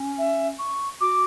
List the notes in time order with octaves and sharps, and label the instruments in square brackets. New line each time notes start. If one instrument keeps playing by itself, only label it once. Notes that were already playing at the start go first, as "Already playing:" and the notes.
Already playing: [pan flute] C#4
[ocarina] E5
C#6
[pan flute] F#4 [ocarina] D6